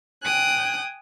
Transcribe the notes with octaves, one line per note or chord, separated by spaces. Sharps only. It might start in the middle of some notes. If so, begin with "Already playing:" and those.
G5 G#5 D#6 F#6